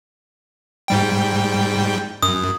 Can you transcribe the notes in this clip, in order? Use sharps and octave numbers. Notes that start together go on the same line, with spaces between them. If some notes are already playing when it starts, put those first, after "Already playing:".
G#2 G3 G5
F#2 D#6